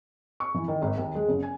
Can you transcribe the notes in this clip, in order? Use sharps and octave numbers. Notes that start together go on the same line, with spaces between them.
C#6
E3
D#3
G#1
D#2
G#3
F#1
G#5